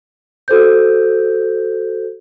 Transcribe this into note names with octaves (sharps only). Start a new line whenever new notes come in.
F#4 A4 C5 G6